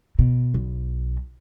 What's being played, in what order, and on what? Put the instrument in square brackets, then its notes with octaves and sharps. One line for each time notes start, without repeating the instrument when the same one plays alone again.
[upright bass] B2
B1